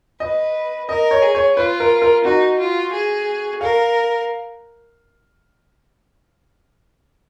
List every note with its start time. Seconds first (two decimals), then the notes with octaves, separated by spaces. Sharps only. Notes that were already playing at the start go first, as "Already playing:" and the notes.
0.20 B4 D#5
0.88 A#4 D#5
1.11 C#5
1.22 G#4
1.35 C#5
1.56 F4 B4
1.80 A#4
2.02 A#4
2.24 D#4 F#4
2.59 F4
2.92 G#4
3.61 A#4 F5